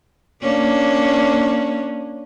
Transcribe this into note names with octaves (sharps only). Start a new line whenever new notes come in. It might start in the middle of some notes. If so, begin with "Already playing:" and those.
A#3 C#4 D4